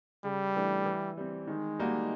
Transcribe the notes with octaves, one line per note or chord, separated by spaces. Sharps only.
C#3 G3
E3 A3 D4
E3
G3 C4
D#3 G#3
G3 A#3 D#4 F#4